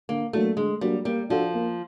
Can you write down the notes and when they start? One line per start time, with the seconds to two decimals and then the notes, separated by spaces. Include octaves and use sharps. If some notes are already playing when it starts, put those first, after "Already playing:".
0.09 D3 A#3
0.33 F#3 A3 A#3 D4 F#4
0.57 D3 G#3
0.81 F#3 G3 A#3 D4 F#4
1.05 G3 A#3
1.30 F3 D4 F#4 A4
1.54 A#3